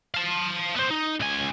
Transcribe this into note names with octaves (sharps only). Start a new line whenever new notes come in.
F5 A5
B3 C5
D#4
C#2 G#5